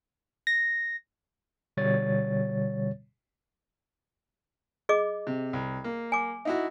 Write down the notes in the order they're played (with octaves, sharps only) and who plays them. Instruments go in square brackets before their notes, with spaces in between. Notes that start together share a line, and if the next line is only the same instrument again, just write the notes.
[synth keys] A#6
[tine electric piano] B2 D3 G3 C#5 A6
[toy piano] G#4 D#5 D6
[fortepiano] C3
C2
A#3
[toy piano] G#5 D6
[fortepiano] D#4 E4 F#4